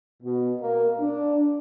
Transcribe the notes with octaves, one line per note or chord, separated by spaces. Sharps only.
B2
A#3
D4